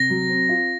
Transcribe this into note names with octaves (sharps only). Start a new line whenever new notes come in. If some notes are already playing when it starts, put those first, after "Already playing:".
Already playing: C3 A#6
F#3
C4
F4